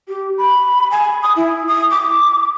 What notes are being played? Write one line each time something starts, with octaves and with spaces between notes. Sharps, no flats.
G4
B5
G#5
D#6
E4
D#6
D6